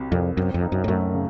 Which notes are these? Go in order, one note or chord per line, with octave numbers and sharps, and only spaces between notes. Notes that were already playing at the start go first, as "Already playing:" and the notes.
Already playing: C2 C3 F#3
C2 F2
F#2 C4
F2
D#4
F#2
A2
F#2 A3
C#3